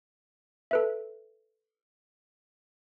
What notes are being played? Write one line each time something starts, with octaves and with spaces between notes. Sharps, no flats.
A4 B4 E5